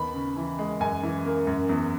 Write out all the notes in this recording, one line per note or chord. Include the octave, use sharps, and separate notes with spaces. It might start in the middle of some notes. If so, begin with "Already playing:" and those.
Already playing: D#2 B3 B5
C#3
E3
G#3
F#2 G#5
E3
A#3
F#2
E2